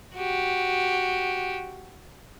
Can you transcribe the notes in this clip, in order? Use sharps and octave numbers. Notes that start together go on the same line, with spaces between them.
F#4 G4